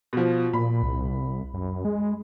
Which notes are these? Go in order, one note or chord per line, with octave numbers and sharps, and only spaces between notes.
B2 F3
A#2 B5
C2
F#2
G#3